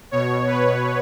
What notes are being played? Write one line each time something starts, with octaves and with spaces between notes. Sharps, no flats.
B2 C#5
B4